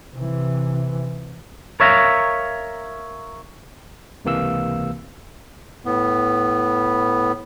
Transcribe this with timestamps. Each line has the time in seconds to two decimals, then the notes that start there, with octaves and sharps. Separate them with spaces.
0.13 C3 E3
1.80 A#4 C#5 E5 F5 A#5
4.25 C#2 C3 E3 A#3 F5 E6
5.85 A2 B3